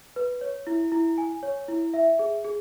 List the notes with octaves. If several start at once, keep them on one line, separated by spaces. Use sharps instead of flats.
B4
C#5
E4
E4
G#5
C#5
E4
E5
G#4
G#4